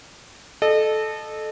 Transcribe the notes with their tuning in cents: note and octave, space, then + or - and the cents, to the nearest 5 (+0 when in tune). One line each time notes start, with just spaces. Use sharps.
A4 -15 D#5 -35